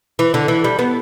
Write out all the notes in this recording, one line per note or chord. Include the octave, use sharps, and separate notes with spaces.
E3
D3
E3
G3
B3